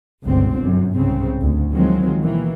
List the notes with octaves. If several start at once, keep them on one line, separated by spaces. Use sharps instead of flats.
G1 C#2 B2 D3 C4
F#2
C2 G#2 C#3 C4
D2
D#3 F3 F#3 G#3 C4
B2 D#3 E3 A#3